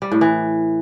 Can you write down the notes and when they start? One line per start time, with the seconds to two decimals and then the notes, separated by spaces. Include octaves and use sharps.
0.02 G3
0.11 A2
0.21 E3